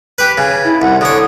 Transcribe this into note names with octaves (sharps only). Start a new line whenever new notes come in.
G4 B4
C#3 G#5
E4
C2 F#5
D3 C#5 D#6